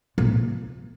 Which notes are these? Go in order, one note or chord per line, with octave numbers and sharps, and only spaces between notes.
A#2